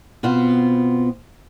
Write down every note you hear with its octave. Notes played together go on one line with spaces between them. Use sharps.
B2 B3 C4 F4